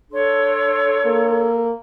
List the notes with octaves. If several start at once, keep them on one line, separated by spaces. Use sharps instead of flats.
D4 A4 C#5 C6
A#3